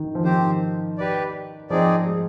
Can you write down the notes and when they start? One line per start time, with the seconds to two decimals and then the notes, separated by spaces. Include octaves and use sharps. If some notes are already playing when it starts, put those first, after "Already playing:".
Already playing: D#3
0.15 F3
0.24 D#3 C4 G4 C5
0.98 G4 B4 D5
1.70 F3 C4 D#4 G#4 D5
2.06 G#3